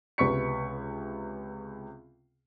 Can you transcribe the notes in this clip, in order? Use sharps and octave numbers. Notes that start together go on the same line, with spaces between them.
C#2 C3 B3 C#6 B6 C#7